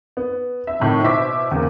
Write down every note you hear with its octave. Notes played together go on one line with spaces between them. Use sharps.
B3
E5
F2 A2 D#3
B2 E4 C5 E5 D6 B6
E2 C#3 A#3